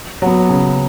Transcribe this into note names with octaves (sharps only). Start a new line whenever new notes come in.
F#3 B3
C#3